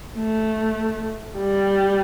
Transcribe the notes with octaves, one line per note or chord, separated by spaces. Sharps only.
A3
G3